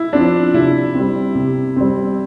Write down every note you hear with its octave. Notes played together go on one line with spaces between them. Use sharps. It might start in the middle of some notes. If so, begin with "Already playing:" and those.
Already playing: E4
F3 C4 D4
C3 E4
G3 C4
C3
G3 C4